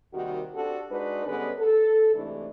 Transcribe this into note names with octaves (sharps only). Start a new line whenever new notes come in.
D#2 C3 D#3 G3 F#4
C4 D4 F#4 G4 A4
G#3 D4 D#4 F#4 B4
D3 G3 G#3 B3 C#4 B4
A4
G#2 C3 E3 A3 D4 E4